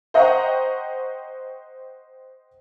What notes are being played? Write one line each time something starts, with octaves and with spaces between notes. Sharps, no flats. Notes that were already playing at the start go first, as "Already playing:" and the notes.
C5 D#5 F#5 G5 A#5 C#6